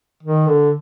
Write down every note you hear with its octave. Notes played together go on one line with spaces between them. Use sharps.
D#3
D3